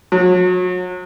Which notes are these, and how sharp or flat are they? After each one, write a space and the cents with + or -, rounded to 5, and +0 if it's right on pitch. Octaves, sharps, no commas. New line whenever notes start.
F#3 -30